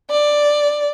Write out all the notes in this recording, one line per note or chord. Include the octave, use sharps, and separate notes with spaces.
D5